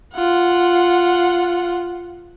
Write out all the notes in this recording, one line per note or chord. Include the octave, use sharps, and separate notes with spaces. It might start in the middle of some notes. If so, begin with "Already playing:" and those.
F4 F#5